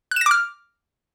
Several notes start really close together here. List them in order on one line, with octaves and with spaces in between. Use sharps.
F#6 E7 A#6 D6 F6